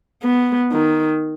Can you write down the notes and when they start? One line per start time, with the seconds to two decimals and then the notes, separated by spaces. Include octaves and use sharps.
0.23 B3
0.72 D#3